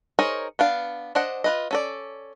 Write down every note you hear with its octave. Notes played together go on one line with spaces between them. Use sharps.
D#4 G#4 A#4 C5 C#5
B3 D4 F5
D4 C5 D#5 F#5
F4 B4 D#5
C#4 A4 D5